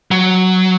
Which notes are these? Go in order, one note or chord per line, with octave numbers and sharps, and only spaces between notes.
F#3